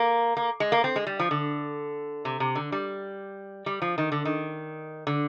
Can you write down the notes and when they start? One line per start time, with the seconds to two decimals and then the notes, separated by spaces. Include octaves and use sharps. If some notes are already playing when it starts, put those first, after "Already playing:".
Already playing: A#3
0.37 A#3
0.60 G#3
0.72 A#3
0.84 C4
0.96 G#3
1.07 G3
1.20 F3
1.31 D3
2.25 C3
2.40 C3
2.55 D3
2.72 G3
3.66 G3
3.82 F3
3.98 D#3
4.12 D3
4.25 D#3
5.07 D3